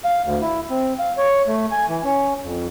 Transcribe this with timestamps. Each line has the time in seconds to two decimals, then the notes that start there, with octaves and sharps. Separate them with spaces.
0.05 F5
0.25 D2
0.42 E4
0.70 C4
0.99 F5
1.18 C#5
1.47 A3
1.71 G#5
1.89 E3
2.04 C#4
2.43 F2